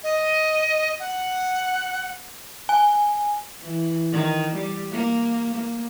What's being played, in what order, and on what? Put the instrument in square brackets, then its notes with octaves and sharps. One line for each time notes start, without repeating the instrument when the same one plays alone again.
[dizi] D#5
F#5
[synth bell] G#5
[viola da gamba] E3
D#3
G3
A#3
A#3